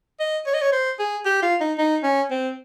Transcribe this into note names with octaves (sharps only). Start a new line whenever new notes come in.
D#5
C#5
D#5
C#5
C5
G#4
G4
F4
D#4
D#4
C#4
C4